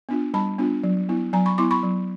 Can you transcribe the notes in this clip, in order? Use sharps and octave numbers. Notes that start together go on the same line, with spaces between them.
B3 D4 F4
G3 A5 B5
B3 D4 F4
F#3
B3 E4
F#3 G#5 A#5
B5 C#6
B3 E4 C6 D6
B5 C#6
F#3